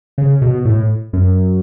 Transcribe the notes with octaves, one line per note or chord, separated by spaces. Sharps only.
C#3
B2
A2
F#2